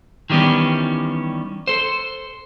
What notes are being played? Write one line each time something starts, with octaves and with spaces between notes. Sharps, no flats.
D#3 E3 G3 B3 C#4
A4 C5